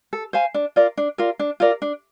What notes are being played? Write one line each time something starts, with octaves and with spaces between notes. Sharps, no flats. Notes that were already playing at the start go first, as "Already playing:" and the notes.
A4
C5 F5 G#5
D4
F4 A#4 D5
D4
F4 A#4 D5
D4
F4 A#4 D5
D4